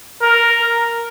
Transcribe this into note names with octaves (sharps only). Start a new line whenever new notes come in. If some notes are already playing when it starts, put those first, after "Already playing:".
A#4